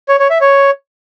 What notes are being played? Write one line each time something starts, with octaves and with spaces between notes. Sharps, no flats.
C#5
C#5
E5
C#5